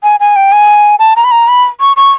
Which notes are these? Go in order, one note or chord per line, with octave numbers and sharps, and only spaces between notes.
G#5
G#5
G5
G#5
A5
A#5
B5
A#5
B5
C#6
C#6